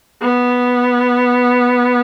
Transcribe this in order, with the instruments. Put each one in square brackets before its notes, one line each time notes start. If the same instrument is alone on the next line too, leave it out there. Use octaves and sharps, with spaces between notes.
[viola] B3